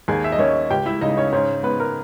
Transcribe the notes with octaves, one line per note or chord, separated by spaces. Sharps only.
D#2 G#4 G#5
E5
D#5
D#2 C#4 C#5
C#2 G4 G5
E4 E5
C#3 D#4 D#5
C#4 C#5
G#2 C#4 C#5
G#2 B3 B4
A#4